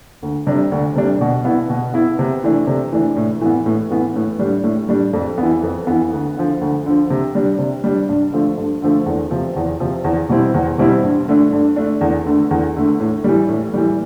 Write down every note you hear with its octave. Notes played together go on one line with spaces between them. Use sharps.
D2
C3 G3 D4
D2
C3 G3 D4
B2
B3 E4
B2
B3 E4
C3
E3 A3 D4
C3
E3 A3 D4
A2
E3 B3
A2
E3 B3
A2
G3 D4
A2
G3 D4
F2
B3
E3
F2
E3 B3
D2
D3 F3
D2
D3 F3
C3
G3 D4
C3
G3 D4
G2
D3 F3 A3
G2
D3 F3 A3
E2
C3 F3
E2
C3 F3
E2
B2 G3 C4 E4
E2
B2 G3 C4 E4
G2
D3 A3 D4
G2
D3 A3 D4
E2
D3 A3
E2
D3 A3
A2
E3 G3
A2
E3 G3